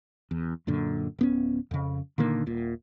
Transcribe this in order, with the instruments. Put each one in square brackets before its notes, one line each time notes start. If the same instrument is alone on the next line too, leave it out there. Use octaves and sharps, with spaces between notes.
[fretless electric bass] E2
F#2 A#2 D3
D1 B3 C#4
F2 C#3
A#2 D3 D#3 A#3
D#1 A#2